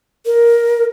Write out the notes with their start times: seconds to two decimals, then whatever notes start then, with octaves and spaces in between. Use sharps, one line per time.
0.26 A#4